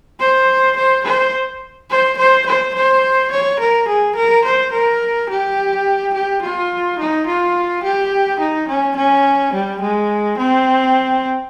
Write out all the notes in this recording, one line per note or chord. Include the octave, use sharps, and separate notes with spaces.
C5
C5
C5
C5
C5
C5
C5
C#5
A#4
G#4
A#4
C5
A#4
G4
G4
F4
D#4
F4
G4
D#4
C#4
C#4
G3
G#3
C4